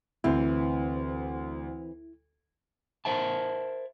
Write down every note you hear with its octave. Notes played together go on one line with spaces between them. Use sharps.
D2 E3 C4 E4
A#4 C5 E5 A5